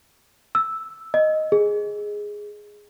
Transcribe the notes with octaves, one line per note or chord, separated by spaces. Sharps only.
E6
D#5
G#4